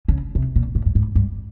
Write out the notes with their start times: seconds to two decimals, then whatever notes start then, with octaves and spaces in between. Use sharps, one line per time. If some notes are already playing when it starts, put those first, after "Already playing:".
0.08 C#3
0.35 C3
0.56 A#2
0.75 A2
0.86 G2
0.95 G#2
1.15 G2